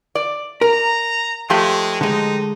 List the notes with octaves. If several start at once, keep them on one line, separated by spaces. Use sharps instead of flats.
D5
A#4 A#5
F3 G#3 A3 G4
D3 G#3 D#4